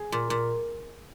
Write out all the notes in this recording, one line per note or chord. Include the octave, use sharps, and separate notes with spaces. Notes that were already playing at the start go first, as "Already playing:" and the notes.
Already playing: G#4
A#2
A#2